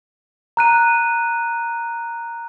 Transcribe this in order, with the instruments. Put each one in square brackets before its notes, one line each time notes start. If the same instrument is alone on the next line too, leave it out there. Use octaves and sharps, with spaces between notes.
[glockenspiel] A#5 F#6 D#7